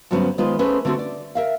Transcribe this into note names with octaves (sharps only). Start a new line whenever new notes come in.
D2 G2 F#3 B3 C#4 C5
D#3 G#3 B3 F4 B4 C5
A3 C#4 G#4 B4 C5
D3 A3 C4 D#4 F#4
D5
A#4 E5 F5